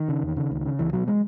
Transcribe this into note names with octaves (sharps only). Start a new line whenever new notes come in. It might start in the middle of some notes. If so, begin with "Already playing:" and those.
Already playing: D#3
C#3
E2
C#3
C#2
C#3
C#2 E3
B2 F#3
G#3